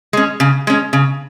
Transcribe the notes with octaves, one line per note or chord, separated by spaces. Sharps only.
G#3 C#4
C#3
G#3 C#4
C#3